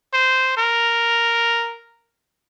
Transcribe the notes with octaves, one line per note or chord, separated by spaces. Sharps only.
C5
A#4